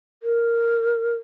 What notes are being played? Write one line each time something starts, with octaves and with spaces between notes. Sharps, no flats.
A#4